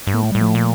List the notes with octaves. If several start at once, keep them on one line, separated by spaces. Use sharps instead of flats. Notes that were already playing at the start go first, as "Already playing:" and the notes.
G2
A2 A#3
A3
A2 G3
F3 A3
A#2